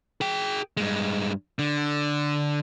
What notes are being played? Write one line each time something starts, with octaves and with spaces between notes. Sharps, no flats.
G#4 G5
G2 G#3
D3